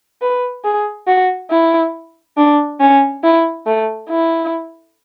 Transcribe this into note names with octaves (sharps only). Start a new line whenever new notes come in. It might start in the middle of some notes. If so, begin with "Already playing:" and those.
B4
G#4
F#4
E4
D4
C#4
E4
A3
E4